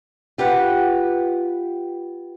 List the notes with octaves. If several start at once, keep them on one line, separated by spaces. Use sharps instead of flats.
F4 G4 B4 F#5